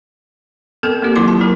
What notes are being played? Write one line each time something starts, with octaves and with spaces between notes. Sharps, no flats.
B3 C4 A4 A#4
A#3 C4 G4
D#3 F#3 E4 F4 C6 D6
A5
F#3 D4 A#4